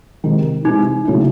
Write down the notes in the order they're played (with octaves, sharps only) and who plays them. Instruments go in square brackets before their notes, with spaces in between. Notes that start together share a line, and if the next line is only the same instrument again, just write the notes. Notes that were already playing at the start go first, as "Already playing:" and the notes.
[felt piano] C3 D#3 G#3
[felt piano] C3 E3 G#3 [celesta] D#4
[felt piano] C#3 F#3 A3 C#4 E4